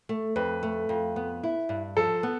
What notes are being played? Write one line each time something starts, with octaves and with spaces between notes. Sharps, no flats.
A3
F2 B4
A3
F2
B3
E4
G2
F3 A4
B3